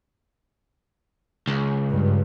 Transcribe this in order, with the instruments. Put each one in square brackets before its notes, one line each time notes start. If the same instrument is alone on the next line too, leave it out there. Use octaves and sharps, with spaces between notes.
[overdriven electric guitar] C#2
[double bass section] G2